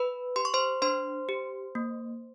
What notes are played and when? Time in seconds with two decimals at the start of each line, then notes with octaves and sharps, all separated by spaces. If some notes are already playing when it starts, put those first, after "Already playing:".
Already playing: B4 B5
0.36 G4 C6
0.45 C#6
0.54 C5 C6
0.82 D4 C5 C6
1.29 G4
1.75 A#3